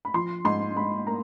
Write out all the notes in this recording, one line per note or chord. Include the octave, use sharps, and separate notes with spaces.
B5
F3 C6
G#2 C6
G#2 B5
A#3 A#5